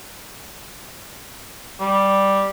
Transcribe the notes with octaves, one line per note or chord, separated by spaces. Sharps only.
G3